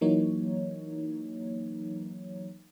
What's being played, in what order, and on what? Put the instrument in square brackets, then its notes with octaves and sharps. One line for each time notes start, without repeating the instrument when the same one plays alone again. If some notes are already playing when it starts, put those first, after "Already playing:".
[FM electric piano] E3 F#3 A#3 D#4 C#5